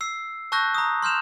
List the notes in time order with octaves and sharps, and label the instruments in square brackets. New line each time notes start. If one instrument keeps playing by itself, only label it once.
[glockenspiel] E6 C7
A5 C#6 E6 F#6 G6 A#6
A#5 D#6
C6 F6 G6 E7 F7